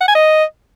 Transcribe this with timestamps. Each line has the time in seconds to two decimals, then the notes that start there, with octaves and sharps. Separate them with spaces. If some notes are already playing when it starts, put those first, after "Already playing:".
0.01 F#5
0.08 G#5
0.15 D#5